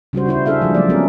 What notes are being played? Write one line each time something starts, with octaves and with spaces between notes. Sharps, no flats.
C#3 G3 F#4 C5
C#3 G3 E4 C5
D4 E4 G#4 A4 E5 F5
F3 G3 G#3
F3 F#3 A3 A#3 D5
G3 B3 C#4 E4 G#4 A#4